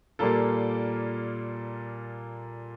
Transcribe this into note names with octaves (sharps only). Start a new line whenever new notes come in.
A#2 G3 A#3 F4 A4